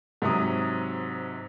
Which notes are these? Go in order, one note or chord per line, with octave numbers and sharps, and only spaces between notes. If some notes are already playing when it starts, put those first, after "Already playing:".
G#2 C3 F#3 A#5 D#6